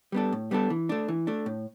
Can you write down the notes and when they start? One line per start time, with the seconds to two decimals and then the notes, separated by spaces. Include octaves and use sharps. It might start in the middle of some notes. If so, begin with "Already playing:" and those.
0.12 G3 B3 D4 A4
0.33 A2
0.51 G3 B3 D4 A4
0.70 E3
0.89 A3 D4
1.08 E3
1.27 A3 D4
1.46 A2